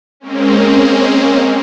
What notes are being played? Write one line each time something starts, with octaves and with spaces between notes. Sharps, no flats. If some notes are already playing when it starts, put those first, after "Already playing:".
G#3 A#3 C4 C#4